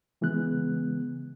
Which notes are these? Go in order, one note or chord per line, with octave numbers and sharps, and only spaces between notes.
C#3 E3 G#3 B3 F#6